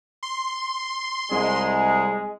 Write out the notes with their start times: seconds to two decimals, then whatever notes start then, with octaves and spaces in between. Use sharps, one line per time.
0.23 C6
1.31 C2 G#3 G#4